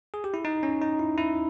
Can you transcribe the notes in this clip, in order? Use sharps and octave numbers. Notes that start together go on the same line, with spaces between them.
G#4
G4
E4
D#4
C#4
D#4
E4
E4